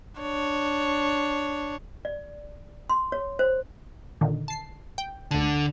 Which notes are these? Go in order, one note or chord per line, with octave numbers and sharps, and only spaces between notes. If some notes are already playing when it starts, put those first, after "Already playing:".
D4 C#5
D5
C6
C#5
C5
A#2 D3 D#3
A5 C7
G5
D2 D3 A5